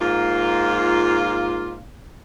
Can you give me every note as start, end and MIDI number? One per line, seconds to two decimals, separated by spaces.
0.01 1.81 44
0.01 1.81 58
0.01 1.81 65